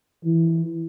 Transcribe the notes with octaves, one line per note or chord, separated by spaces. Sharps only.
E3